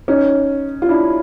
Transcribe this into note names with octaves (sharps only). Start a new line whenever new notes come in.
C#4 D#4
F4
D4 E4